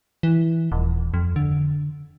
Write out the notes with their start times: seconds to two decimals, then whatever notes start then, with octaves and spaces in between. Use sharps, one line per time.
0.23 E3
0.72 D#1
1.14 F2
1.36 D3